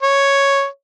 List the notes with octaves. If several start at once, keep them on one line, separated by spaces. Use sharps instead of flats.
C#5